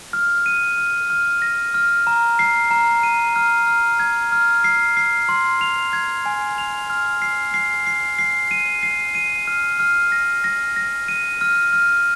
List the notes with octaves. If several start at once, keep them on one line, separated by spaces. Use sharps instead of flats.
F6
D#7
F6
F6
A#6
F6
A#5
C7
A#5
D#7
F6
F6
G#6
F6
C7
C7
C6
F7
G#6
G#5
F7
F6
C7
C7
C7
C7
D#7
C7
D#7
F6
F6
A#6
A#6
A#6
D#7
F6
F6